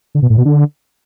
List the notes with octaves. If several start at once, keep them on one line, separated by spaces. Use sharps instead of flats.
D3
B2
A2
B2
D3